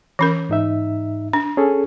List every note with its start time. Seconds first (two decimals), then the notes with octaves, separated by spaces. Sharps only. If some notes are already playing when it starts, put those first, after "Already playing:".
0.19 E3 C#4 A#4
0.49 G#2 D#4 E5
1.33 D4
1.57 C#4 G#4 A4